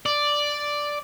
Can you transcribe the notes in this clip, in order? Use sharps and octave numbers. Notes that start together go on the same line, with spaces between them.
D5